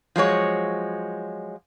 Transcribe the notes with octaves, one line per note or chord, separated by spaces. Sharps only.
F3 F#3 G#3 C#5